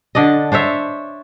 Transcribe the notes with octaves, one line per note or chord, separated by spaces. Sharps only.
D3 D4 D5 D#5
D4 C5 C#5 E5